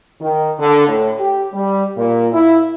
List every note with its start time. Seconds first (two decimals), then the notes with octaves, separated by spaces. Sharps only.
0.21 D#3
0.59 D3
0.88 A2
1.18 G4
1.53 G3
1.97 A#2
2.33 E4